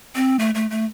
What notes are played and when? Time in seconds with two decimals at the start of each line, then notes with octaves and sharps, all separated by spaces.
0.15 C4
0.39 A3
0.55 A3
0.70 A3